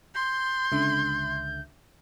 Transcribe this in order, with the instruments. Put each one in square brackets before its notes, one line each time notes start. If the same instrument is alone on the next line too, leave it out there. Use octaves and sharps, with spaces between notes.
[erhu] C6 [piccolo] G6
[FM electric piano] C#2 D3 E5